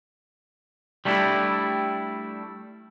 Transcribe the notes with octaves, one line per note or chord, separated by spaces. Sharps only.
G3 A3 D4 E4